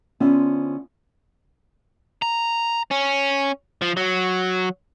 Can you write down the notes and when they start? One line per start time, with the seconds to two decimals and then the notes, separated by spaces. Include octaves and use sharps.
0.20 D3 B3 C#4 F4 C5 E5
2.22 A#5
2.91 C#4
3.82 F3
3.97 F#3